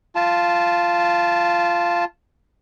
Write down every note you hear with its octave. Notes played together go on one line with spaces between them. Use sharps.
F4 A5